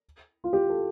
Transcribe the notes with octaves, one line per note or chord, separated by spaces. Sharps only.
F4
G4
A4